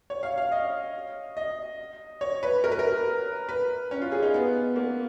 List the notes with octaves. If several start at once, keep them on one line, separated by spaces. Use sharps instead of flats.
C#5
F5
F5
D#5
D#5
C#5
B4
A#4
B4
A#4
B4
C#4
F4
G#4
D#4
B3
A#3